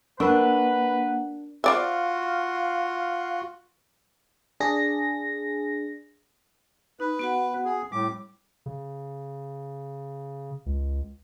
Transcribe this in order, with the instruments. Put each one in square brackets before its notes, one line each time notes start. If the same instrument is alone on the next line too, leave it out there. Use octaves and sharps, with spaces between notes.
[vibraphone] A#3 F#5 [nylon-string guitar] D4 [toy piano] A#4 C#6 [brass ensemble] B4
[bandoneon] F4 [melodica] F#4 [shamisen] C5 D5 E5 [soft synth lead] F5
[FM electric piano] D4 G#4 A#6
[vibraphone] D#4 [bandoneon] B4
[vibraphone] B3 F#4 F#5
[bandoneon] G#4
[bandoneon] A2 D6 [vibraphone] G3
[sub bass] C#3
C#2